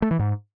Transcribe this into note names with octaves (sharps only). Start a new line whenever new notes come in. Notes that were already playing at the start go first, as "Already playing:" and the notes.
A3
E3
G#2